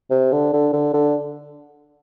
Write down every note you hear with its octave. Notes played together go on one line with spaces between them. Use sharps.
C3
D3
D3
D3
D3